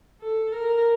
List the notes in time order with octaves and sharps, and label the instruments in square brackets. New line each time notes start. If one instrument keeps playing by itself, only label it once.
[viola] A4
A#4